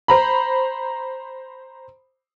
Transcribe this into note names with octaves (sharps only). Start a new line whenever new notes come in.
C5 A#5 B5